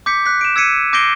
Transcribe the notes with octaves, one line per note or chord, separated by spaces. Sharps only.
D6 G6 B6 C#7
F#6 B6
D7 E7
E6 G#6 B6 C#7 D#7
D6 G6 A#6 C7 D7 G7